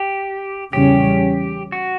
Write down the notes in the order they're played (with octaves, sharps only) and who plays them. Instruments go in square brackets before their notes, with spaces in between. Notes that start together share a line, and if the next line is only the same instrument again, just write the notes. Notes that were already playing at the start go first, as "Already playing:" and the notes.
Already playing: [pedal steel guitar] G4
[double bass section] E2 C#3 G3 C#4 [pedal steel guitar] G4
[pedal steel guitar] F#4